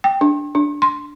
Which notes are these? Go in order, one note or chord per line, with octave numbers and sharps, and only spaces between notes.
G5
D4
D4
C6